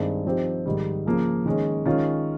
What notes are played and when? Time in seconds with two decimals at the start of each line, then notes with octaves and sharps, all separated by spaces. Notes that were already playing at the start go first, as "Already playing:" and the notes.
Already playing: G2 D#3 G#3 C4
0.25 F3 C4 D#4 G4 C5
0.66 G#2 D#3 G3
1.06 C#3 F3 A#3
1.46 D#3 G#3 C#4
1.86 D#3 G#3 C#4 F4